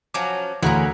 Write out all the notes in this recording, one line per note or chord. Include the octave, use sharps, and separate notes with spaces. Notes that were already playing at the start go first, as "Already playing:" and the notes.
F3 F#3 C#4 D6
D2 C#3 E3 C#4 E4 F#4 A#4